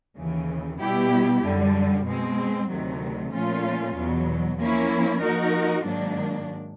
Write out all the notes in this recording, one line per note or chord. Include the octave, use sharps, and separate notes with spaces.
D#2 C#3 E3
B2 G3 B3 E4 G4
F#2 D3 G3
B2 G#3 C4
D2 C3 D#3 F#3 A3
A#2 F3 A3 C#4 F4
E2 B2 F#3
F3 A#3 C#4 E4
F3 A#3 D#4 F#4 A#4
G#2 D#3 F#3 A#3 D4